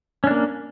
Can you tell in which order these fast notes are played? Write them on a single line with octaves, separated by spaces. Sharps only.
C#4 D4 A#3